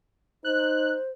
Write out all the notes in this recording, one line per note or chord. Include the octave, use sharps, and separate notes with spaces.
D#4 C5 F#6